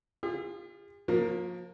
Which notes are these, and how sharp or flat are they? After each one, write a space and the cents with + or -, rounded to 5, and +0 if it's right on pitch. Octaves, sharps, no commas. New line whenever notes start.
F4 +0 G#4 -45
F3 +40 A#3 +0